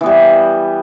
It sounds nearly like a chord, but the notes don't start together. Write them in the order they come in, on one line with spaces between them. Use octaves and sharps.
E3 B3 G3